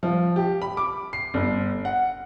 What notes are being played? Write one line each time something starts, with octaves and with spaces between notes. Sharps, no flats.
F3
G4
B5
D6
C7
G1
F#5